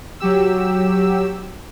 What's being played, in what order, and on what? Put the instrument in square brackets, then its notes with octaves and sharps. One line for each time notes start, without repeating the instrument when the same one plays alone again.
[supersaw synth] F#3 G4 E6